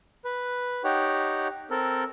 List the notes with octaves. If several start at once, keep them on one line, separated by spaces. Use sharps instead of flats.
B4
D#4 G4 C#5 F#5
C4 A4 A#4